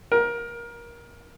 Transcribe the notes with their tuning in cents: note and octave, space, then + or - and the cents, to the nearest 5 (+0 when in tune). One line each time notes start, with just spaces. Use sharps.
A#4 +20